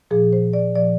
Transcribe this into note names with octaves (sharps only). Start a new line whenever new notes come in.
A#2 F3 G#4
C5
D5
A#2 F3 D5